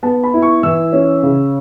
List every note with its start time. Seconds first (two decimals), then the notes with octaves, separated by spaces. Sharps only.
0.03 B3 A5
0.24 B5
0.34 E4
0.42 C#6
0.63 E3 E6
0.92 C#4
1.23 C#3